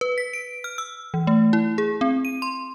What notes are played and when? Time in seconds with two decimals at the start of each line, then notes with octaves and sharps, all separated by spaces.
0.01 B4
0.18 B6
0.34 D7
0.64 F6
0.78 E6
1.14 E3
1.27 A3
1.53 E4
1.78 G#4
2.01 C4
2.25 D#7
2.42 C6